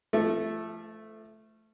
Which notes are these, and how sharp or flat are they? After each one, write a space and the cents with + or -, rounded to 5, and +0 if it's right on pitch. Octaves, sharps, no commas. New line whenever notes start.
F3 -35 A3 -5